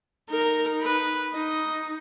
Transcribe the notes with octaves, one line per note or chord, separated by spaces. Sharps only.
D#4 A#4
B4
D#4 D#5